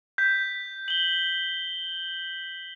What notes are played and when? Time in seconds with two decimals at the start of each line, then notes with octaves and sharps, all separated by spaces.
0.18 G6 B6
0.88 F#7 G7